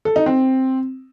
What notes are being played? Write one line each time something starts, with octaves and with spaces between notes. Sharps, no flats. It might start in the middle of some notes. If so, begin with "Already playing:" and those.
A4
D#4
C4